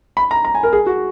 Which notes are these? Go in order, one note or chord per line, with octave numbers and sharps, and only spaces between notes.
B5
A#5
A#5
G#5
A#4
G#4
F#4